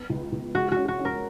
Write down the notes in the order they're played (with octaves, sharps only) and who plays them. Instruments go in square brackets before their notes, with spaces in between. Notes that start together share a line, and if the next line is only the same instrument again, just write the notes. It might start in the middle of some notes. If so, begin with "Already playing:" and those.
Already playing: [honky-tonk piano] B3
C#2
C#2
[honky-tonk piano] G#3 [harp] F#4
[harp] F#4
[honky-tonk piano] C#4
[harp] F#4
[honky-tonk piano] C#4
[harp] A#4